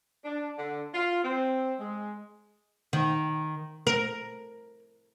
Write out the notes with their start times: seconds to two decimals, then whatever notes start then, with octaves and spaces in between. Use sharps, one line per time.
0.25 D4
0.58 D3
0.94 F4
1.24 C4
1.80 G#3
2.93 D#3
3.87 A#4